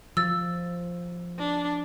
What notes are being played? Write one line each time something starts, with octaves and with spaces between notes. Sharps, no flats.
F3 E6 A6
D4